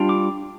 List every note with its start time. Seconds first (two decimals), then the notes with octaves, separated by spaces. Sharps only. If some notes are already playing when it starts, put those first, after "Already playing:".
Already playing: G3 D4 F4
0.09 D6